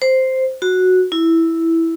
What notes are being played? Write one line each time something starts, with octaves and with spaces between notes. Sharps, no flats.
C5
F#4
E4